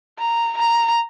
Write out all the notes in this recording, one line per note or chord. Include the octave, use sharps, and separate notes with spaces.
A#5
A#5